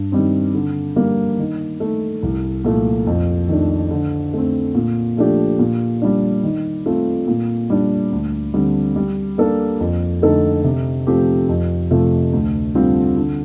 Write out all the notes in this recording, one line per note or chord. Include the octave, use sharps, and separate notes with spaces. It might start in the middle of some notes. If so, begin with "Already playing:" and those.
Already playing: G2
D#3 G3 C4
D3
G3 A#3
D#3
A3 D#4
C2
A#2 F3 A3
F2
D#3 A3 D4
D3
A3 C4
A#2
F3 A3 D4 G4
A#2
G3 D4
D#3
A3 C4 F4
A#2
G3 D4
D2
D3 G3 C4
G3
A#3 D4 A4
F2
D3 A3 D#4 A4
C3
F3 A3 C4 G4
F2
C3 F3 A3
D2
D3 G3 C4 F4
D3